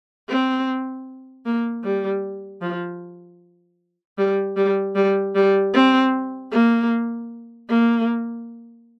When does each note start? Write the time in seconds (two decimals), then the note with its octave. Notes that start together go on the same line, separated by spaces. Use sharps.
0.29 C4
1.45 A#3
1.83 G3
2.62 F3
4.18 G3
4.56 G3
4.95 G3
5.35 G3
5.74 C4
6.52 A#3
7.69 A#3